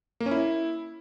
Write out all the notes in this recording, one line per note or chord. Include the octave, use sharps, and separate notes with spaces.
A#3
C#4
E4